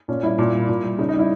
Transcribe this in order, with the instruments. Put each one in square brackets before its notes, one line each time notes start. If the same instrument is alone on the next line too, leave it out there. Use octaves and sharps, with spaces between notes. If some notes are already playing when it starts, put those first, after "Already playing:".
[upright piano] A#2 C#4
G3 E4
A#2
G3
A#2
G3
C#3 D#4
D#4
G3
E4